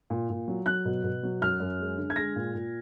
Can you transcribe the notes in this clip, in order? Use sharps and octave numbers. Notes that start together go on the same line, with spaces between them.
A#2
A#2
F#3
F#3 F#6
B2
B2
F#3
F#2 F6
F#2
G#3
D3
G#6
G#3 A#6
A#2
A#2